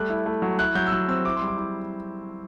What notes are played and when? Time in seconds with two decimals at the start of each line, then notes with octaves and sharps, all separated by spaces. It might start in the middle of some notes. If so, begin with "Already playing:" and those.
Already playing: G3 A3 F#6
0.10 E4
0.26 A3
0.42 F#3
0.59 E4 F#6
0.75 F#3 G6
0.86 E6
0.92 F#3 F#6
1.08 C4 E6
1.25 E4 D6
1.36 C6
1.41 G3
1.48 D6
1.58 E4